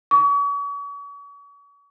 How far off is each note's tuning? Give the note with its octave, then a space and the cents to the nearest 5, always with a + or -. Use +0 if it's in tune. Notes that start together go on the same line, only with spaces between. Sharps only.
C#6 +40